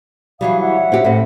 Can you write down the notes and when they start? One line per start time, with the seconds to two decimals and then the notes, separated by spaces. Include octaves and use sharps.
0.41 E3 F#3 G3 F5 D#6
0.60 C#5 E5 F#5
0.92 C4 F#4 G4
1.04 A2 C4